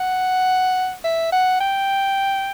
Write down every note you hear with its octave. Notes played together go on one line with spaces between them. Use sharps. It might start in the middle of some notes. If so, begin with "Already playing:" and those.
Already playing: F#5
E5
F#5
G5